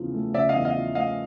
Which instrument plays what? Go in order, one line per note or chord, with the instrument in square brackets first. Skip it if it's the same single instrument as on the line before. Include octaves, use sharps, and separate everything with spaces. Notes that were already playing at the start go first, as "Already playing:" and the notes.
Already playing: [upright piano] E2 C#3 F3
A3
[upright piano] C#3 [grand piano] D5 E5
[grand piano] D#5 F5
[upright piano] E2
[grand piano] D#5 F5
[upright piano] F3
[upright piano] A3 [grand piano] D#5 F5